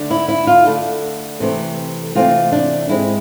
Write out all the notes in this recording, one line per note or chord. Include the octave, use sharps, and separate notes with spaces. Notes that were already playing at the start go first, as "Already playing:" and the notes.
Already playing: D3 A3 D4
E4
E4
F4
D3 A3 D4 A4
C3 E3 A3 C4
C3 E3 A3 C4 F4
D4
G#2 G#3 C4 E4